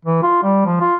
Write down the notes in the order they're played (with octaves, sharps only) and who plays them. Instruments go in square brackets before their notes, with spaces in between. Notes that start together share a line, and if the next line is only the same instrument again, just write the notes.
[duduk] E3
F4
G3
F3
F4